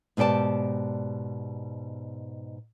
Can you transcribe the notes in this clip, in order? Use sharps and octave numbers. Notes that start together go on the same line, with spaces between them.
G#2 B2 G4 D5 A5